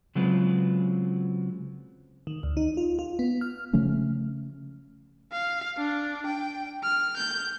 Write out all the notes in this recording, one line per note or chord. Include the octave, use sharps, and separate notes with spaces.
C#3 F#3 G#3 C4 F4 B4
D#3
D2
D#4
F4
F4
B3
F6
C#3 F3 A3 C#4
F5
D4
G5
F6
G6